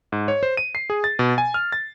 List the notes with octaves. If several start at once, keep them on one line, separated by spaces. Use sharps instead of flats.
G#2
C#5
C5
D#7
C7
G#4
A6
B2
G#5
F6
A6